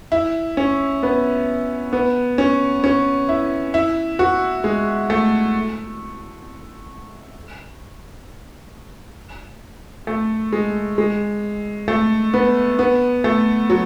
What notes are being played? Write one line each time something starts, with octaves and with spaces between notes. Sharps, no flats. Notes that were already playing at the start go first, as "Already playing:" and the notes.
E4
C#4
B3
B3
C#4
C#4
E4
E4
F#4
G#3
A3
A3
G#3
G#3
A3
B3
B3
A3
F#3